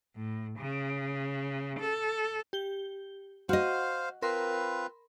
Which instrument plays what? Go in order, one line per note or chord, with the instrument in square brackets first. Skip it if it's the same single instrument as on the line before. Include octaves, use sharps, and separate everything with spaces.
[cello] A2
C#3
A4
[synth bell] G4 G7
[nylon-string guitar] F#4 D#5 [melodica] C5 F5 [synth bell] F#5
[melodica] C4 F4 B4 [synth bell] A#4 B5 C6